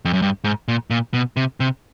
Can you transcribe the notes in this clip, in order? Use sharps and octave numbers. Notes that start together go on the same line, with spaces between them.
F2
F#2
G2
G#2
A#2
A#2
B2
C3
C3